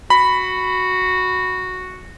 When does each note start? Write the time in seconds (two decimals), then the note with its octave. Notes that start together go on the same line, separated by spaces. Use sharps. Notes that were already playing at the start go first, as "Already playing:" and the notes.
0.10 F#4 B5